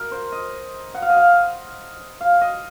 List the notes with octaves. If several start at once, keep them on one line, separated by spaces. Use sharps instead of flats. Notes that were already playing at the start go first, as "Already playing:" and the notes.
Already playing: A#4 D#5
C5
D#5
F#5
F5
D#5
F5
F5
D#5